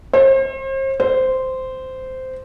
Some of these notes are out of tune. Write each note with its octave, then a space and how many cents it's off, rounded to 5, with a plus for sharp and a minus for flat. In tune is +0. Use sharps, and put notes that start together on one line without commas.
C5 +40
C5 -10